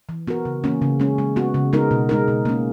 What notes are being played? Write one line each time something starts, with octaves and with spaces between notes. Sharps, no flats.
E3
B3 F#4 A#4
C#3
E3 A#3 C#4
C#3
G#3 C#4
G#3
B3 F#4
C#3
G#3 B3 D#4 A#4
B2
G#3 D#4 A#4
B2
A#3 C#4